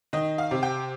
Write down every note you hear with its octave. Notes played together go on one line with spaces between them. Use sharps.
D#3 D#5
F5
C3
G5